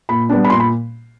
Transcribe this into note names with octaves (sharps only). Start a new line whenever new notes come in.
A#2 B5
G3 B3 D4
B5
A#2 C6
B5